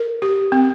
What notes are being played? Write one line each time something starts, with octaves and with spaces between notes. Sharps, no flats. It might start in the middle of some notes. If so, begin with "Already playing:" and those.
Already playing: A#4
G4
C4